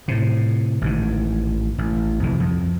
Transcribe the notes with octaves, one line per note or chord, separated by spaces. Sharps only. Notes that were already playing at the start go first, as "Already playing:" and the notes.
A2 C3
A1 G#2 D#3
A1
C2 F2 E3
F2